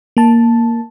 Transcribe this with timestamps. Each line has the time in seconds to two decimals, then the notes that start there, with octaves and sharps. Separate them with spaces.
0.17 A#3 A5